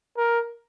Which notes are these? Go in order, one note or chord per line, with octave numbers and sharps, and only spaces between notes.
A#4